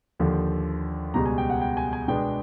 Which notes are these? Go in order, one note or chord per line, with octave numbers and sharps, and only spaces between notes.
D#2 D3 F3
C#2 B2 G3 A#5
G#5
G5
F#5
G5
G#5
G#5
B2 G#3 B3 D4 G5